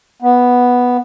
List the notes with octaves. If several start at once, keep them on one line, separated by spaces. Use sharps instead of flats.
B3